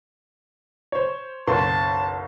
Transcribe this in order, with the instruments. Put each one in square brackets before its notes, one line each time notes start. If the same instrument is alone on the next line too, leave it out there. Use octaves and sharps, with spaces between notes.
[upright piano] C5 C#5
[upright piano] F#1 B1 C6 [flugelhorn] A5